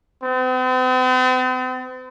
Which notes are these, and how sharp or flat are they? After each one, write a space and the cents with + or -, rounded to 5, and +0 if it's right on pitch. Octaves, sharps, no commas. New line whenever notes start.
C4 -45